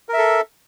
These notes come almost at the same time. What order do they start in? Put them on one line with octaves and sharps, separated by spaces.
A#4 E5 A4